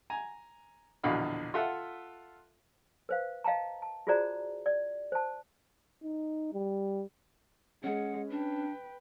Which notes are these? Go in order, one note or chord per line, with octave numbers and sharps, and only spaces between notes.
G#5 A#5
A#1 E2 B2 D3 F5 B5
F4 A4 E5 F#5
B4 C5 F5
D#5 F5 G5 A5 A#5
A5
F4 F#4 G#4 C5 D5 A#5
D5
C5 A5
D#4
G3
G#3 C#4 F#5
D4 B4 G5